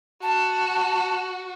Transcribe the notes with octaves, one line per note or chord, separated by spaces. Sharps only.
F#4 A5